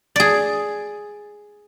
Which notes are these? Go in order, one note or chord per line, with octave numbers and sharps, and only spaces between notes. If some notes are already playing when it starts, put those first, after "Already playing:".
G#4 D5